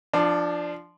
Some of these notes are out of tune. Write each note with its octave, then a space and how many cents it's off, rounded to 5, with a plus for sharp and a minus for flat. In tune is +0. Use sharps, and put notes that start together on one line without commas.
F3 -10 D4 +10